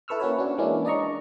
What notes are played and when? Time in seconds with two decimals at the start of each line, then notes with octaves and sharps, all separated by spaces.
0.08 E4 A4 B4 C#6 E6 F6
0.20 A#3 C#4 E4 F#4 B4 C#5
0.38 C#4 D4 F#4
0.58 E3 G#3 A#3 C#4 D4 E4
0.85 D4 D5 D#5 A#5 C#6